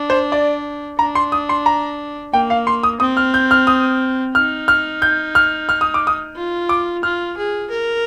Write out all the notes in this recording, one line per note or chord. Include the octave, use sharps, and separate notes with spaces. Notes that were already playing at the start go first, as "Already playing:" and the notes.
Already playing: D4
C5
D5
D4 A#5
C6
D#6
C6
A#5
A#3 G5
F5
C6
D#6
C4 D#6
F6
G6
F6
D#6
D#4 F6
F6
G6
F6
F6
D#6
D6
D#6
F4
D6
F4 F6
G#4
A#4